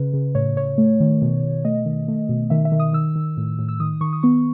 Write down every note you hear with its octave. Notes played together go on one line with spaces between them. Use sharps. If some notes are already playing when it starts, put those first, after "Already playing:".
Already playing: C#3 B4
C#3
A2 C#5
A2 C#5
A3
D#3
B2
B2
A3 D#5
D#3
A3
B2
D#3 E5
E5
D#3
D#6
D#3 E6
D#3
A2
A2
E6
D#3 D#6
D#3 C#6
D#6
B3 C#6